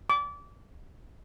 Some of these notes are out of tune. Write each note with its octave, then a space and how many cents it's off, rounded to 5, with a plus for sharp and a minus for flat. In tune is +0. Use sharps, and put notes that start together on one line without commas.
D6 -30